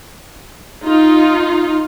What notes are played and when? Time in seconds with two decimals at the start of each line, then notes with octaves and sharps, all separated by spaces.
0.83 D#4 F4